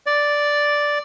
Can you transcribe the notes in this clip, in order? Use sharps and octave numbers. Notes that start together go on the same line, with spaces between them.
D5